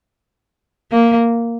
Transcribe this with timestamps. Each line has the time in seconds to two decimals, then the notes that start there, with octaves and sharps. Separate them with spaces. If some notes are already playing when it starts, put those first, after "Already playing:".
0.92 A#3